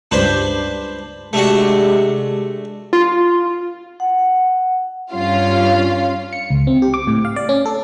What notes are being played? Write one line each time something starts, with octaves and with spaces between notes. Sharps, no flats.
C#2 G2 D4 B4 C5
C3 G#3 A3 D4 F#4
F4
F#5
G2 C#4 F4 F5
C#7
C#2
C4
G4
D6
A2
F5
D5
C#4
A4